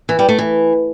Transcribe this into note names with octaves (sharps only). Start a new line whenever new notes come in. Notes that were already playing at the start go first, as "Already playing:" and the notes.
E3
G3
A3
E3